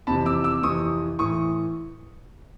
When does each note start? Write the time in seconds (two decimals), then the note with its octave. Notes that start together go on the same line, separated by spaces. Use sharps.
0.07 F2 C3 E3 A5 B5
0.26 D6 E6
0.44 D6 E6
0.62 F2 C3 E3 C#6 D#6
1.19 A2 E3 C#6 D#6